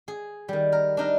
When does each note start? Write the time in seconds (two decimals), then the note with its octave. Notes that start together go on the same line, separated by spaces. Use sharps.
0.08 G#4
0.49 D#3 G3
0.72 A#4
0.97 D4 D#4 A#4